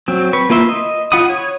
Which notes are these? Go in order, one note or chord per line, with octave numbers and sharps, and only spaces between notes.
F#3 C4
B4 C#6
A#3 F4 B4 E5 C6
D#5
F4 F#5 B5 D#6
C#5